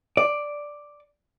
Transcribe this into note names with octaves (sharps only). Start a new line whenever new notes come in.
D5